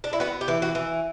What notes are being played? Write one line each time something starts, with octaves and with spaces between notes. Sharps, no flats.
D4
E4
B3 F#4
G4
E3
F#4
E3